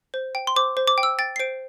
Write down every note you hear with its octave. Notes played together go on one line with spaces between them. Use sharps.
C5
G5
C6
C5 D6
C5
D6
G5
E6
G5 A6
C7
C5 D7